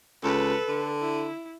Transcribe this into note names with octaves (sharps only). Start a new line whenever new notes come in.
C#2 A4 B4
D3
E4